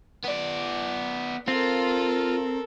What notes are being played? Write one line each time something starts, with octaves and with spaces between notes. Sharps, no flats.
B3 D5
C4 F4 A4 A#4